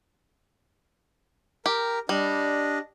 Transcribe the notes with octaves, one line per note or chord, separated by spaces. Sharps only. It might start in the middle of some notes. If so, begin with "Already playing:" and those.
G4 A#4
G3 D4 D#5